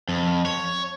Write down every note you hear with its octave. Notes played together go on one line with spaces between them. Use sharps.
F2
C#5